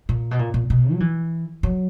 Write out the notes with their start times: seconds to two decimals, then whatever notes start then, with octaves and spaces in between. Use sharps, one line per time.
0.09 A#2
0.31 B2
0.39 A#2
0.54 A#2
0.70 B2
0.93 F#3
1.00 E3
1.63 F#3